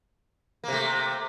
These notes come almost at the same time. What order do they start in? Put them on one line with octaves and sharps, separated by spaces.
A#3 C3 A3